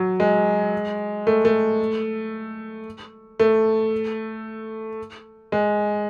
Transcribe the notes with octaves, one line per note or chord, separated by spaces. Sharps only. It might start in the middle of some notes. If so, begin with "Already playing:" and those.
Already playing: F#3
G#3
A3
A3
A3
G#3